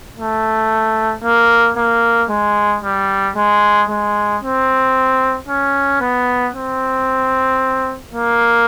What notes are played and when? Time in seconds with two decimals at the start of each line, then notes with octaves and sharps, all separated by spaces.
0.19 A3
1.24 A#3
1.77 A#3
2.30 G#3
2.83 G3
3.36 G#3
3.89 G#3
4.42 C4
5.48 C#4
6.01 B3
6.54 C4
8.13 A#3